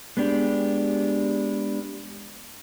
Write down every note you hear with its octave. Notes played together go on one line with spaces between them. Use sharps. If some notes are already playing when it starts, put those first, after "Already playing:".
G#3 B3 D4 G4